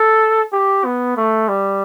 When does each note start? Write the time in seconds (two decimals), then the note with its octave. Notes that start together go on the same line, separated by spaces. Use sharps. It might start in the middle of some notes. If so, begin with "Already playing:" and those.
Already playing: A4
0.53 G4
0.85 B3
1.17 A3
1.49 G3